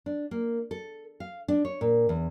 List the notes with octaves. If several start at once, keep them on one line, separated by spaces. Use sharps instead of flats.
D4
A#3
A4
F5
D4
C#5
A#2
E2